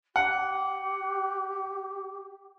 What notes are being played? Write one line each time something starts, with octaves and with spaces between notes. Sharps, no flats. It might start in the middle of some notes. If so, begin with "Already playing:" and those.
G4 F#5